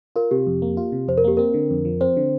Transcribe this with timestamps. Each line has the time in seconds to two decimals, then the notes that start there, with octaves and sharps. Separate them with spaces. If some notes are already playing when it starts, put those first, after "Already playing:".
0.16 F4 A#4
0.31 C3 G4
0.47 F2
0.62 A#3
0.77 F4
0.92 C3
1.08 F2 C5
1.18 A#4
1.24 A#3 G4
1.37 C4 A#4
1.54 D3
1.70 F2
1.85 F3
2.01 C4 C5
2.17 D3